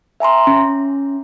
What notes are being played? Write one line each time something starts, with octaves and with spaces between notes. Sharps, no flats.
E5 G#5 A#5 C6
C#4